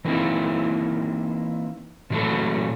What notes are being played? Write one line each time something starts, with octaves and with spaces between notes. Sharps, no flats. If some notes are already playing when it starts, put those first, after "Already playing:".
E3 F#3 A#3 C4 D#4 E4
A#2 E3 F#3 A3 F#4 A4